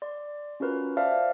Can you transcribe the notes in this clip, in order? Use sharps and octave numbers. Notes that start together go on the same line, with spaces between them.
D5 C6
C#4 F4 F#4 A#4 B4
C5 D5 E5 F5 A5 F6